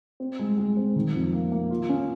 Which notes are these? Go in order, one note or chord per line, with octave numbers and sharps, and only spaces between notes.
C4
G#3
G#3
C4
D#3
F2
A#3
A#3
F4
C#4